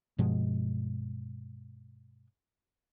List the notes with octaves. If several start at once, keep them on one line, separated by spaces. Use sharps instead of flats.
G2 B2 F3 G#3